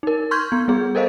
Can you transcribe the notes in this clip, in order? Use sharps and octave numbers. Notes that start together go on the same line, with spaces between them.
D#4 A#4
C6 C#6 F6 G6 G#6
B3
G3 B3 G#4
A4 A#4 C5 D#5 F5